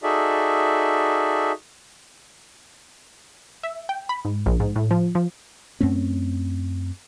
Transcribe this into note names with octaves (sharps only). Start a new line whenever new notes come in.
D#4 F#4 G#4 A4 D5 E5
E5
G5
B5
G#2
A#1
G#2
A2
F3
F3
F#2 A3 C4 C#4